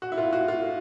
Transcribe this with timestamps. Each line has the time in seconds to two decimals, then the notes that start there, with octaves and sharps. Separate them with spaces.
0.02 F#4
0.12 E4
0.18 F4
0.33 F#4
0.48 F4